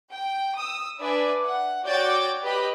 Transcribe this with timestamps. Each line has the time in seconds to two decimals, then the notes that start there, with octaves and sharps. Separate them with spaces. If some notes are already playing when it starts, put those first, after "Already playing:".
0.11 G5
0.56 D#6 E6
0.99 D4 B4 D5 E5 G#5
1.45 F#5
1.85 F#4 C#5 D5 G5 G6 A6
2.42 G4 B4 D#5 B5